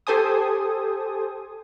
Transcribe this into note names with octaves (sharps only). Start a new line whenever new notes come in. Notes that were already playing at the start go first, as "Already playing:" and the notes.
G4 A4 C5 G#5 D#6